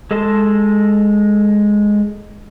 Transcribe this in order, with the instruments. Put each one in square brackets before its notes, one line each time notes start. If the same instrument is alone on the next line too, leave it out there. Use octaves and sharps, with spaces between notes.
[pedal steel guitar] G#3 A4 D#5 A5 C6